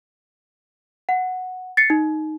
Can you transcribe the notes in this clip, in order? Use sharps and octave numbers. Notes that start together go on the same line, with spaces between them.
F#5
A6 C7 C#7
D#4